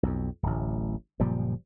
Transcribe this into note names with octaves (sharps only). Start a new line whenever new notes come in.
B1 F2
D1 A1
F#1 A#2 F3 G3